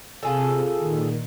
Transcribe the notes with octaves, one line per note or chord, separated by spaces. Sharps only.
C3 F4 G#4 A4
A#2 D#3